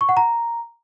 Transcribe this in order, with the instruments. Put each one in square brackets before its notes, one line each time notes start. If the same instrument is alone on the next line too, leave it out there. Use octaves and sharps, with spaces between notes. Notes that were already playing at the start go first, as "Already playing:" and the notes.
[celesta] C#6
F#5
A#5